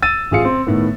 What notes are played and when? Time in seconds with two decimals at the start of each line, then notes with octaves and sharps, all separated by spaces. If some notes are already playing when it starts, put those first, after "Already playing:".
0.02 E6 A6 D#7
0.31 A1 F4 G#4 F5 C#7
0.45 C4
0.67 A2 D#3 B3